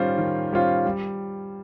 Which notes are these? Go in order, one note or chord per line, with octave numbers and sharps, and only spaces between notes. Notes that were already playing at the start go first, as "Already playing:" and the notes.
Already playing: D#3 G3 C#4 F4 C5
D#3
G3 C#4 F4 C5
G3